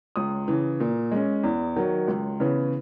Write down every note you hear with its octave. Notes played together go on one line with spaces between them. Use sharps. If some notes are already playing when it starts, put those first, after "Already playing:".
C#2 D#6
C#3 E3
A#2
G#3 C#4
E2
D#3 F#3
C#2
C#3 E3 B3